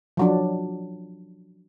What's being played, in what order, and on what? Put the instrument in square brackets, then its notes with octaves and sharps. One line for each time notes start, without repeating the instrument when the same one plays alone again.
[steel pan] F3 F#3 D4